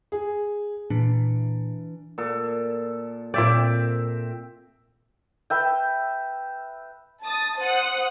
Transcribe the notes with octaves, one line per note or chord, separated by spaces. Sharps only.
G#4
A#2 E3 D4
A#2 A4
A#2 C4 D5 E5 G5
B4 E5 G5
A5 D#6 A6
C5 F#5 D#6